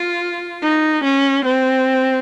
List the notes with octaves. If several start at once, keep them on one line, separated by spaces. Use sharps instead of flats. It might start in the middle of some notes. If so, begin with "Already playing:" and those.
Already playing: F4
D#4
C#4
C4